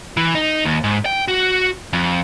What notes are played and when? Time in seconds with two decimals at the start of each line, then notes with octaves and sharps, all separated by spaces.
0.17 E3
0.35 D#4
0.65 D#2
0.84 G#2
1.06 G5
1.28 F#4
1.93 F2